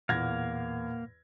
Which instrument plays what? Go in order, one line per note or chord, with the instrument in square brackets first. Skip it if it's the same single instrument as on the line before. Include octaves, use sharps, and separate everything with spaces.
[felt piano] E2 G#6 A#6 [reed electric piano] A#2 F#5 [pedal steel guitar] A#3 F5